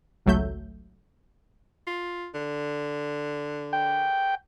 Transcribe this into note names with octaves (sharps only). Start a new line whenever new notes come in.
G#1 C#2 F#3 A3 E5 G6
F4
D3
G5